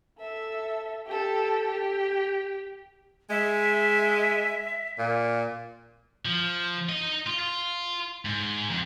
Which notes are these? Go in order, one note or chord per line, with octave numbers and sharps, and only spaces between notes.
A4 E5
G4 A4
G4
G#3 E5
A#2
F3
D#4 D#5
F4
F4
G#2
F2